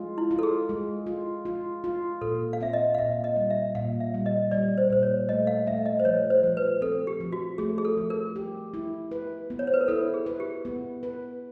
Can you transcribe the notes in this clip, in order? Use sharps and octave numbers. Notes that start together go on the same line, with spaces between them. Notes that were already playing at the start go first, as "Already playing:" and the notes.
Already playing: G#3 F4
E4
F4
A4
G#4
G#3
F4
F4
F4
A#2 A4
F5
C4 E5
D#5
F5
A#2 E5
D#5
G3
E5
A#2 F5
E5
G3
D#5
G3 D5
C5
A#2 C5
C#5
A3 D#5
F5
A3 E5
D#5
C5
F3 C#5
C5
F3
B4
C4 A4
G4
F3
F#4
A3 G#4
G#4
A4
F3
A#4
G4
E4
B4
B3
C#5
C5
B4
A#4
E4 A4
G#4
B4
G4
B3
B4